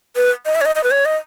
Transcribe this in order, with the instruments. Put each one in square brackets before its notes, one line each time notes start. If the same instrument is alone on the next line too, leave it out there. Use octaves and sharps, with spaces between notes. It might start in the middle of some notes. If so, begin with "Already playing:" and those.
[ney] B4
D#5
E5
C#5
D#5
D#5
B4
C#5
D#5